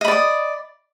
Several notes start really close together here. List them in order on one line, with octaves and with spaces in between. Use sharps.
D#5 B5 D5 D#6